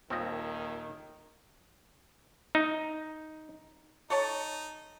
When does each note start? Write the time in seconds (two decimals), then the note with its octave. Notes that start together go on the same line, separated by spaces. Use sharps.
0.10 D#1 D#3 C4 F4 D#5
2.55 D#4
4.10 D#4 A4 C#5 A5